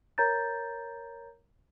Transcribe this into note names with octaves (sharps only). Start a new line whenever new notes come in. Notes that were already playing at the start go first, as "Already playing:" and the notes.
A#4 C#5 A#5 G6 A6